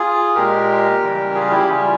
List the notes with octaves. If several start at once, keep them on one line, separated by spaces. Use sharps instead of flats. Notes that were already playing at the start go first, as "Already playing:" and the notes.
Already playing: F4 G#4
A#2 G#3 G4 A#4
C#3 E3 G3
F4 G#4
E4 G4
C#3 G3 C#4 F4